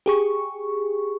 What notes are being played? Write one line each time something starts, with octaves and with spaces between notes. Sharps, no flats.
G4 G#4 C#6